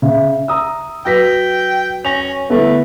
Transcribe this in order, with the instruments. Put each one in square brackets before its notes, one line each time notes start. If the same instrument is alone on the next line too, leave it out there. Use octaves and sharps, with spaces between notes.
[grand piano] C#3 [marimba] E5
[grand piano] A#5 D#6 E6
[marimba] F#3 F#4 B4 [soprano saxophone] G5 [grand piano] E6 A#6 B6
[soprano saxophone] C#4 [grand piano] A#6 F7
[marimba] D3 G3 E4 [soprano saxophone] A3 [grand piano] B3 A4